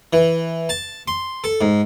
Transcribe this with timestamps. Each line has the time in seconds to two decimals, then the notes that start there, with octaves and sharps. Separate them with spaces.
0.13 E3
0.69 A5
1.08 C6
1.44 A4
1.61 G#2